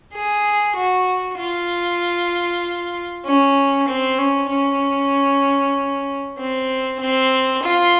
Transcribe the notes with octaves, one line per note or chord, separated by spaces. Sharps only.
G#4
F#4
F4
C#4
C4
C#4
C#4
C4
C4
F4